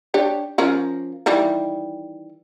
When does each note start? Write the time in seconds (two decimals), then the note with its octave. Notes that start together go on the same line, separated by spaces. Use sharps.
0.14 D4 G4 C#5
0.58 F3 C#4 A#4
1.26 D#3 E3 G3